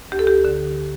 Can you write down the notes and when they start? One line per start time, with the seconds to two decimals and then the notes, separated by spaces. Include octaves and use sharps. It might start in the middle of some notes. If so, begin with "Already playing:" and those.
0.12 D2 G4
0.19 A4
0.27 G4
0.45 D3